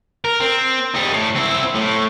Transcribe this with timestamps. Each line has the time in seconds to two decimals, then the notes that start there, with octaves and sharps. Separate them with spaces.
0.24 A#4
0.40 C4
0.94 G3 D#4
1.13 A2
1.36 C4 E4
1.75 A2